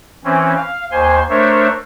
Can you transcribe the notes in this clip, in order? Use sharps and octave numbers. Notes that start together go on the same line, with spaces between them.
E3 C4 C#4
F5
D#2 C5 G#5 C6
A3 D4 A#4 C5 C#5 E5